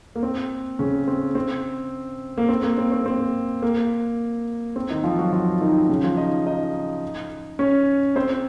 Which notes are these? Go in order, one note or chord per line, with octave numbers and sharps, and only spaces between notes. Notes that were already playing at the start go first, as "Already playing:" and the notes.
A#3
C4
C#3 C#4
C4
C4
A#3
C4
A#3
C4
C4
C4
A#3
C4
D#3 D#4
F3 F4
F#3 F#4
F3 F4
D#3 D#4
C#3 C#4
F3 F4
D#4 D#5
D#4 D#5
C#4 C#5
C4 C5